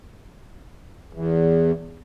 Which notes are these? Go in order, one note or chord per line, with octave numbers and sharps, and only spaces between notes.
E2